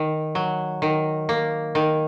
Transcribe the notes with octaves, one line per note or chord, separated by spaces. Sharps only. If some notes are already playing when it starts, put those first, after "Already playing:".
Already playing: D#3
F#3
D#3
A#3
D#3